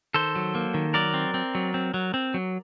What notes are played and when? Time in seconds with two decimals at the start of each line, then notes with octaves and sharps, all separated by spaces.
0.14 D#3 A4 C5
0.35 F#3
0.55 A#3
0.74 D#3
0.94 F#3 A#4 D5
1.14 C4
1.34 C4
1.55 F#3
1.74 C4
1.94 F#3
2.14 C4
2.34 F#3